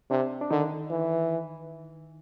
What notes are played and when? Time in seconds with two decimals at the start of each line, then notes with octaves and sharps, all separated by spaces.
0.10 C3 D4
0.41 D4
0.51 D3 D#3 D#4
0.90 E3